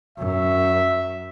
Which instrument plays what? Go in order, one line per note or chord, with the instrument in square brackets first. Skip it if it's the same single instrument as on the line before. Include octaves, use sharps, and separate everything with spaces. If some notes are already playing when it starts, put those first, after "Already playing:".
[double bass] F#2 [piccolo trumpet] E5